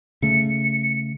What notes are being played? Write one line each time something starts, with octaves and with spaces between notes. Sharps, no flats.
C#3 A3 C#7